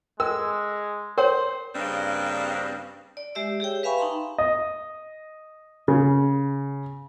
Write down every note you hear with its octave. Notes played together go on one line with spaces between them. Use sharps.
G#3 A#4 E6
A#4 C5 C#5
G2 C#3 G3 A#3 C4
D5
G#3 G4 D5 E5 E6
G4 G#4 C#5 G5
B4 E5 F5 G#5 B5 C#6
D#4 G5 A5 A#5 C6
D#5
C#3